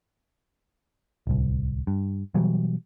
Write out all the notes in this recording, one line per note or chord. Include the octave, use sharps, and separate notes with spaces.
D1 C2
G2
B2 E3 F#3 G3